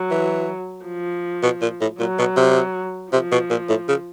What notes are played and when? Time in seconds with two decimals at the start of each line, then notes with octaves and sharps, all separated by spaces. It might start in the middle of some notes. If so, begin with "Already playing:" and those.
Already playing: F#3
0.10 E3
0.86 F3
1.43 B2
1.61 A#2
1.81 A2
1.99 A#2 F#3
2.18 B2
2.36 C3
3.12 C3 F3
3.31 B2
3.50 A#2
3.69 A2
3.88 C#3